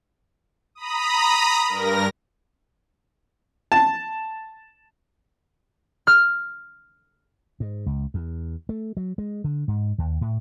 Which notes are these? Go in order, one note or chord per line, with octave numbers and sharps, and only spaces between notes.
A#5 B5 D#6
G2 A#4 A#6
A5
F6
G#2
C#2
E2
A3
F#3
G#3
D3
G#2
D#2
A2